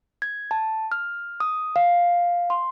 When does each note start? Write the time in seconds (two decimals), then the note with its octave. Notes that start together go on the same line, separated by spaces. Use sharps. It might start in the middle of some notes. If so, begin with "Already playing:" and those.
0.22 G#6
0.51 A5
0.92 F6
1.40 D#6
1.76 F5
2.50 C6